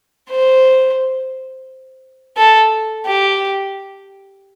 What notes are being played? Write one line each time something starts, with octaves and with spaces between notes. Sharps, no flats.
C5
A4
G4